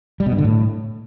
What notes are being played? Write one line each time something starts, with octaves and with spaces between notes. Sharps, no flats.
G3
B2
G2
D3
A2